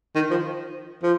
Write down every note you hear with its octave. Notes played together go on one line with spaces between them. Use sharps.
D#3
F3
F3